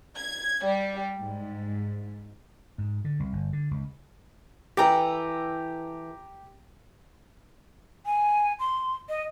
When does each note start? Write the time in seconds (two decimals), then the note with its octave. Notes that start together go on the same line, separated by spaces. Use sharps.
0.18 G#6
0.66 G3
1.19 G#2
2.78 G#2
3.05 D3
3.20 C2
3.33 G1
3.53 D3
3.71 C#2
4.77 E3 G4 A4 B4 G5 A#5
8.06 G#5
8.60 C6
9.09 D#5